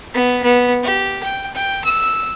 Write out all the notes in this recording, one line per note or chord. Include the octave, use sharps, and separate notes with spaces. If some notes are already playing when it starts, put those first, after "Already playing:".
B3
B3
G4
G5
G5
E6